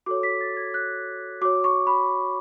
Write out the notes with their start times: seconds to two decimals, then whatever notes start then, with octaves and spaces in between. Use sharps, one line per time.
0.06 F#4 A4 C#5 D6
0.23 B6
0.41 A6
0.57 G#6
0.74 F#6
1.42 F#4 D6
1.45 C#5
1.64 C#6
1.87 B5